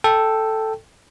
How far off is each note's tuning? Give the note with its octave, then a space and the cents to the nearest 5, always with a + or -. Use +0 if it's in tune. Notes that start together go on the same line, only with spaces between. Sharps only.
A4 +0 G5 +0